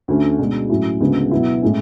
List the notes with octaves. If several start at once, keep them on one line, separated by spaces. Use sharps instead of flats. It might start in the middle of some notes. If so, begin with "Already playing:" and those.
D2 D3 A3 C#4
B2 G#3 D4
A2 F#3 C#4 E4
D2 C#3 G#3 B3
B2 F#3 B3 E4
A2 G#3 C#4